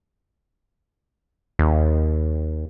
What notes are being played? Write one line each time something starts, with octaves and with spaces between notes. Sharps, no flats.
D#2